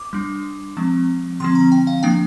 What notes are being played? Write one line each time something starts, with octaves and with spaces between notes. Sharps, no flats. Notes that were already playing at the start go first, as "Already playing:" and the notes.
Already playing: D6
G3 D4
F3 G#3 C4
D3 F3 C4 C6
A#5
G5
F5
F3 A#3 D4 G5